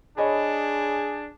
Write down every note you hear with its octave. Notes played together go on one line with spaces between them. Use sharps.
D4 G#4 C#5 D#5 B5